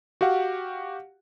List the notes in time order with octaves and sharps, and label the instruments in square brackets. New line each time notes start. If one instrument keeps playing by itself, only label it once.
[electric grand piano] F#4 G4 F5 F#5